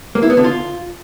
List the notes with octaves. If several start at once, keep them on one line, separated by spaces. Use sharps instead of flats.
A#3
E4
B3
D3
F4